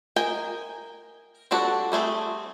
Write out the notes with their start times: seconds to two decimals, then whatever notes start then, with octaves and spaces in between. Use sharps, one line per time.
0.16 A#4 D#5 G5 G#5
1.51 G3 C4 D4 F#4 A4
1.92 G3 A3 C4 G#4